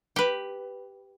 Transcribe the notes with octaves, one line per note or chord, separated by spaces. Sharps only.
G4 B4